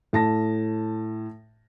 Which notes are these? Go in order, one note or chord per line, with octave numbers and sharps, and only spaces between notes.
A2 A5 A#6